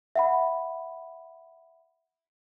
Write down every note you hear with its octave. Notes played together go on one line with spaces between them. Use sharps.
E5 F#5 B5